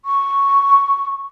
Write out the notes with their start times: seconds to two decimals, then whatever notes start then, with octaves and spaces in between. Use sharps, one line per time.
0.05 C#6